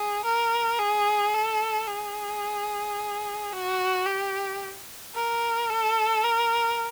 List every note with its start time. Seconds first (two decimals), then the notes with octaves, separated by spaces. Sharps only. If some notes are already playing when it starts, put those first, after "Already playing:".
Already playing: G#4
0.25 A#4
0.79 G#4
1.34 A4
1.88 G#4
3.52 F#4
4.06 G4
5.14 A#4
5.70 A4
6.24 A#4